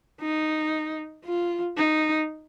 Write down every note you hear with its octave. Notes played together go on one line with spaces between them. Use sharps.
D#4
F4
D#4